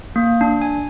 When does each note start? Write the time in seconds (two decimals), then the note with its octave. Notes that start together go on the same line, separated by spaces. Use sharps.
0.16 A#3
0.41 D4
0.62 G#5